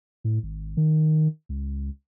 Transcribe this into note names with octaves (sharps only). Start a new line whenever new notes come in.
A2
G#1
D#3
C#2